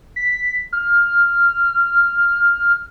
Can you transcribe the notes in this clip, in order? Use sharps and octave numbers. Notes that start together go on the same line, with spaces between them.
B6
F6